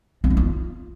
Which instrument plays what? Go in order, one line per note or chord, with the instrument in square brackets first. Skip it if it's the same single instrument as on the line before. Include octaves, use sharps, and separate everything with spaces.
[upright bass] C4
D#4
F4